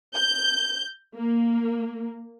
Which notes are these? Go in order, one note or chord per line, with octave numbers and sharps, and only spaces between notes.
G6
A#3